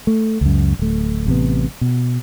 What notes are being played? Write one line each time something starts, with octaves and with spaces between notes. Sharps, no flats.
A3
C#2 F#2
D1 A3
A1 C3 B3
B2